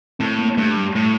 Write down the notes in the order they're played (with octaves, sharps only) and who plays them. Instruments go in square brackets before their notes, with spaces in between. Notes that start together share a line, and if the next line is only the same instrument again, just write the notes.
[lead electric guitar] A2 [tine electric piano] C4
[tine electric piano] A#3
A#3
[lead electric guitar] G2 [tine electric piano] A3
[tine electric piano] G3
[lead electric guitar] A2 [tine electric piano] A3